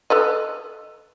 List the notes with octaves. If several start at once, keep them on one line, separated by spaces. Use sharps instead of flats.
A4 B4 D#5